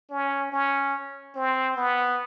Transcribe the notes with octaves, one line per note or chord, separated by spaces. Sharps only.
C#4
C#4
C4
B3